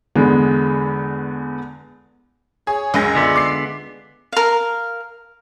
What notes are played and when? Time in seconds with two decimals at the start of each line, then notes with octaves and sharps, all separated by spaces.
0.15 E2 D3 G#3 B3
2.67 G#4 C#5
2.94 C#2 F#2 G#3 A#6
3.15 D3 B3 F4 D5 E5
3.36 D6 C7
4.32 A#4 F5